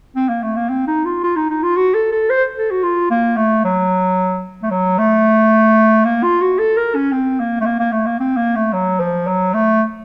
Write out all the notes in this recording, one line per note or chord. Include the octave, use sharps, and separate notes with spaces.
C4
A#3
A3
A#3
C4
D#4
F4
F4
D#4
D#4
F4
F#4
A4
A4
C5
A4
F#4
F4
A#3
A3
F#3
A3
F#3
A3
A#3
F4
F#4
A4
A#4
C#4
C4
A#3
A3
A#3
A#3
A3
A#3
C4
A#3
A3
F#3
F3
F#3
A3